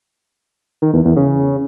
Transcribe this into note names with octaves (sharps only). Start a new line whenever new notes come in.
D#3
E2
E2
C#3